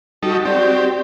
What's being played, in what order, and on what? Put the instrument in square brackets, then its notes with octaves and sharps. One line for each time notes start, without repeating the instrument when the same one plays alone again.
[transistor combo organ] G3 D#4 A4 [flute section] F#4
[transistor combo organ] C4 G4 [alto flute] D5